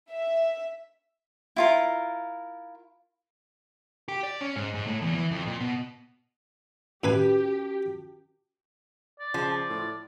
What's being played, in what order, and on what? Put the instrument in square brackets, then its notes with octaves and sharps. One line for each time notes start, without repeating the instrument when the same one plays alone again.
[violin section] E5
[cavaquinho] E4 F4 A#4
[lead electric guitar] G4
D5
C#4
G#2
G#2
A2
E2
E3
F2
A#2
B2
[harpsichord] A2 B4 G#5 [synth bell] C#4 F#4 [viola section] G4
[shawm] D5
[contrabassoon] C#3 [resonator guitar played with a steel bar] F3
[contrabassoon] A2